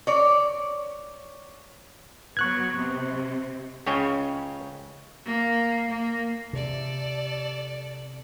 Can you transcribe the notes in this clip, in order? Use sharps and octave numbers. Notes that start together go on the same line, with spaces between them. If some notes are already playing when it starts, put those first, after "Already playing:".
C#5 D5
F#3 B3 C#6 F#6 G#6
C3
C#2 C#3 C#5 G5 G#5
A#3
A#3
C3 A4 D5